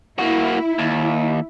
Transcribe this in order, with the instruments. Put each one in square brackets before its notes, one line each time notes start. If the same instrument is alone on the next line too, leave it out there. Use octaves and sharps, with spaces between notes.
[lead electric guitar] A#3 F#4 [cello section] E4
[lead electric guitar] D#2